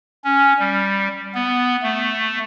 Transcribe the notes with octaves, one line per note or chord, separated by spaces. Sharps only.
C#4
G3
B3
A3